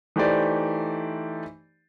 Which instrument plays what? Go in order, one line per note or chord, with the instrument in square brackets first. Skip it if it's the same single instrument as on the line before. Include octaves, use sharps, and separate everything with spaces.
[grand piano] E3 A3 D#4 G4 C5 D5